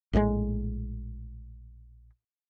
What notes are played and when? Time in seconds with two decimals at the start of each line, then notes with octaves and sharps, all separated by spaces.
0.13 A#1 A2 D3 G#3